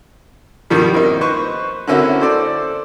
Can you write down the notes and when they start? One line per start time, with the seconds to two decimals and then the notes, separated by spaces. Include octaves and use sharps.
0.70 G2 B2 D#3 F3 G3
0.94 A#3 C4 D#4
1.21 B4 C5 C#6
1.87 D3 A#3 C4 C#4 E4 F#4
2.20 A4 C5 D5